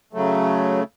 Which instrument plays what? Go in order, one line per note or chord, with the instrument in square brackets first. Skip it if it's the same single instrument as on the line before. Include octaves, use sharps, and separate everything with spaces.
[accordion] C#3 F#3 A3